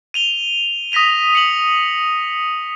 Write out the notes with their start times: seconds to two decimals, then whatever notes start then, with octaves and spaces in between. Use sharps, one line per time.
0.14 D#7 F7 G7
0.92 D#6 A#6 B6 D#7 F7
1.35 C#7 F#7